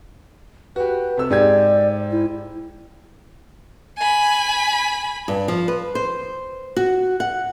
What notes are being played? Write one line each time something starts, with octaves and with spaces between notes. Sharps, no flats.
F#4 G4 B4
C3 A4 E6
G#2 G4 D5 G#6
E4
G#5 B5
G2
F3
B4
C5
F#4
F#5